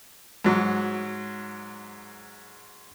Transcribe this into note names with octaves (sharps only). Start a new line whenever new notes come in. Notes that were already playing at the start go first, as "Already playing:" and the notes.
G#2 F#3